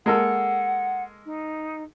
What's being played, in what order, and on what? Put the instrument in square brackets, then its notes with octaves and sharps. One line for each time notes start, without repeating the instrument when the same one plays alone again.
[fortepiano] G#3 A#3 A4 [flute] F#5
[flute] D#4